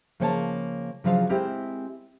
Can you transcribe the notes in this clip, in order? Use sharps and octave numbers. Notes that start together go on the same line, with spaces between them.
C#3 F3 A#3 C#5 F#5 A5
C#3 F3 F#3 D4 F4 F5
G#3 C4 E4 G4 A#4